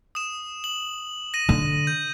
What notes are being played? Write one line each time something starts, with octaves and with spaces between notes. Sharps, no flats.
D#6 E7
F#7
A#6 D#7
D3
G6